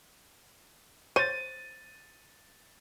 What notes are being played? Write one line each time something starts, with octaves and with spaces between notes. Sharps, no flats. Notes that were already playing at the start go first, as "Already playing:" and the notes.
C5 C#5 A6 D#7